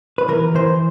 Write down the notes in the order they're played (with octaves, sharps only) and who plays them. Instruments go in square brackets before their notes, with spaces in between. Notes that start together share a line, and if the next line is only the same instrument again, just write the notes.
[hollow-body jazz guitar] B4
E3 A#4
E3 C5